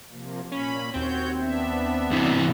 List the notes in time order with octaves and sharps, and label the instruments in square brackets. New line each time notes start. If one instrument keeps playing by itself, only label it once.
[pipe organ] C3 F3 A#3
[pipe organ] A#2 A#3 B5 [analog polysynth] C#4
[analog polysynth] D#2 C4 [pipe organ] F#4 C#5 G6
[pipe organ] B3 D4 E5
[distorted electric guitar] C3 E3